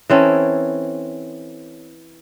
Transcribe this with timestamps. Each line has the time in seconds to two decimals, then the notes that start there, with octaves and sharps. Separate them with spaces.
0.10 E3 C4 C#4 A4